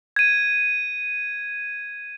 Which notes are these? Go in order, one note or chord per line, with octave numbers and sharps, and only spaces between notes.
G#6 D#7